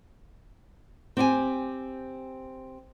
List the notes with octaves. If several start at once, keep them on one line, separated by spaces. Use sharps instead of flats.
C4 G4 G5 G#5